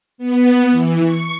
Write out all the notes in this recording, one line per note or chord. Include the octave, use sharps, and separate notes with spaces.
B3
E3
C#6